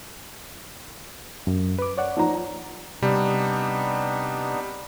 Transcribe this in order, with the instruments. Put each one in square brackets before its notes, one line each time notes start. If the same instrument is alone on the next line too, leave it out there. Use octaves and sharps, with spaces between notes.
[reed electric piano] F#2
B4 D6
C#5 D5 F#5
[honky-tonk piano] F3 D#4 A#5
[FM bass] C3 [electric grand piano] G3 [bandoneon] B3 D4 D#4